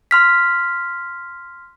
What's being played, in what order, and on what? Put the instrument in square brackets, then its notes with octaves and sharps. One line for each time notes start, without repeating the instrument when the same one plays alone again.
[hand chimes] C6 F6 B6